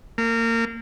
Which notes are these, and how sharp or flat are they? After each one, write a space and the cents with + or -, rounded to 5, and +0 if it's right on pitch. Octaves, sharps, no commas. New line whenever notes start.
A#3 -25